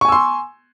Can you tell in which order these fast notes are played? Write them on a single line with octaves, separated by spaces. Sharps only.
C#6 G#5 E6 C6